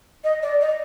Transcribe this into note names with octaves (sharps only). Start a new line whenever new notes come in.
D#5
D5
D#5